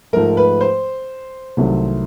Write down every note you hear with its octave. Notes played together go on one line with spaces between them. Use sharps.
G#2 F3 A3 A#4
B4
C5
C2 C3 D#3 F#3 A3